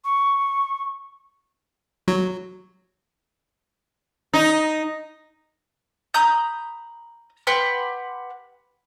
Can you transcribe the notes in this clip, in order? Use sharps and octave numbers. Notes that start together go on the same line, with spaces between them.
C#6
F#3
D#4
A#5 B5 D#6 G6
G4 B4 F#5 C6